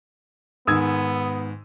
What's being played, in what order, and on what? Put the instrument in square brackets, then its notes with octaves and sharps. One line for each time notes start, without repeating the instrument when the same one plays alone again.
[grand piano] G#2 D#3 [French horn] B3 [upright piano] D#6 E6 G#6